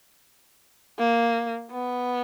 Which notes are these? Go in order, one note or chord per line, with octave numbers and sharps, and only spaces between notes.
A#3
B3